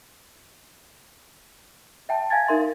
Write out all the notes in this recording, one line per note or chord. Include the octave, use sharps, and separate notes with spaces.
E5 G5 A5
F5 G#5 G#6 A6
D#4 A#4 E5 C6